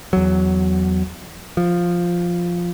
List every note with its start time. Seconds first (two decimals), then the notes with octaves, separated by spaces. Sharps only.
0.13 E2 F#3
1.57 F3